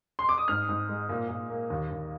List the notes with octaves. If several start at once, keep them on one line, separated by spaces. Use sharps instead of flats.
C6
D6
D#6
G#2 F6
G#2
G#3
A#2
A#2
A#3
D#2
D#2